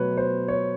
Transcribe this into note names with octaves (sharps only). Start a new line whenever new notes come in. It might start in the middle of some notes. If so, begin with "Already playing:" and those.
Already playing: B2 F#3 A3 B4 C#5
C5
C#5